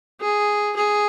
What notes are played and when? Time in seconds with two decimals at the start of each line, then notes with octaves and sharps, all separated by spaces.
0.21 G#4
0.76 G#4